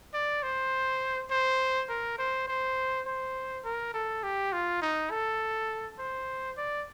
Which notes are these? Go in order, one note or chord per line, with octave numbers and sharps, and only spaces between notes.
D5
C5
C5
A#4
C5
C5
C5
A#4
A4
G4
F4
D#4
A4
C5
D5